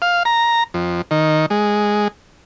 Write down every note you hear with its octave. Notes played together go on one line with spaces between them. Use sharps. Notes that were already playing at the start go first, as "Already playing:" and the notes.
F5
A#5
F2
D#3
G#3